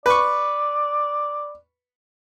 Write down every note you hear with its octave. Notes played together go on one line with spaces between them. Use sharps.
B4 D5 C#6